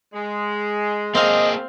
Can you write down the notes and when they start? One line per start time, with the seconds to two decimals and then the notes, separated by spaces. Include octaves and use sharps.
0.14 G#3
1.15 A#3 C4 G#4 D#5 F5